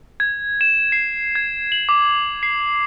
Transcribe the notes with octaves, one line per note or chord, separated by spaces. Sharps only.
G#6
E7
C7
G#6
F#7
D6
C7